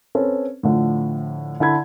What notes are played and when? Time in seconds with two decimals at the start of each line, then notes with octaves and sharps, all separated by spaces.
0.15 C4 C#4 A4 B4
0.63 A2 D3 F3
1.60 D3 E4 A5 B5 G#6